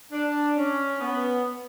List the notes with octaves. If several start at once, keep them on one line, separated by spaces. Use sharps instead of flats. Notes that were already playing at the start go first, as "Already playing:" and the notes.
D4
C#4
B3